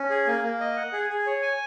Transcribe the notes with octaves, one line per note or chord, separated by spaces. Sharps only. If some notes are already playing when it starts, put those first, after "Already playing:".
Already playing: C#4
G#4
A#3
A#3
D#5
F#5
G#4
G#4
C#5
G#5